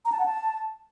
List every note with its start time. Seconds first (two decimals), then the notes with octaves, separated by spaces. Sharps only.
0.05 A#5
0.12 A5
0.19 F#5
0.26 A5